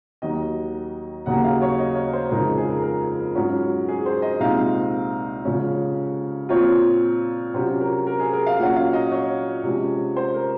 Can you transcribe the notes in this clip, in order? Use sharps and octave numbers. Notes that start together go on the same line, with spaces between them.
D#2 D#3 F#3 D#5
D#2 C#3 F#3 A#3 F#5
F5
C#5
D#5
C#5
C5
F2 C#3 F3 G#3 D#4 A#4
G#4
A#4
A#4
G#2 F#3 C#4 F4
G#4
C5
D#5
C2 A#2 G#3 C4 D#4 F5
C#3 F3 G#3 C#4
A#2 F3 C4 F4 C#5
C3 F#3 C#4 F4 C5
A#4
A#4
G#4
A#4
F5
A#2 F#3 C#4 F#5
F5
D#5
C#5
C3 F3 G#3 C#4
C5
A#4